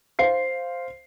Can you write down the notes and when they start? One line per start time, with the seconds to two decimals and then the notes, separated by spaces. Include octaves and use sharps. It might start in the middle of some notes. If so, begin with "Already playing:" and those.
0.19 C5 F5 C7